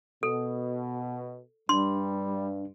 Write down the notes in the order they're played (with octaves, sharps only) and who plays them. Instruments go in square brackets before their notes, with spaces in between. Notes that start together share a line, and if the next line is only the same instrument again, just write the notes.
[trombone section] B2 [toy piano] A4
[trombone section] G2 [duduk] G3 [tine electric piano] D4 [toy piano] C6